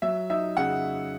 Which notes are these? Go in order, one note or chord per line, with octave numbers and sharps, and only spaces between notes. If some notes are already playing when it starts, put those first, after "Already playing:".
F#3 E5
D#4 E5
C#3 F#5